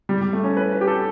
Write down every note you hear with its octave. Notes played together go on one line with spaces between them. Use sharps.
G3
G3
A3
C#4
B4
B4
G4
A4